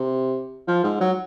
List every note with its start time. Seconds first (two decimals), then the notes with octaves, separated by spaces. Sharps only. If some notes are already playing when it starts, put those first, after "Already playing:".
Already playing: C3
0.68 F3
0.84 G#2
1.01 F#3